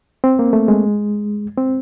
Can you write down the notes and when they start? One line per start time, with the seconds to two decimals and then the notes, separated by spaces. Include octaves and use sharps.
0.24 C4
0.39 A#3
0.53 A3
0.68 G#3
1.57 C4